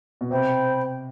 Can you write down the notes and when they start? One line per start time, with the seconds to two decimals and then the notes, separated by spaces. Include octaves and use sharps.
0.21 B2
0.31 C3 C5 G5 B5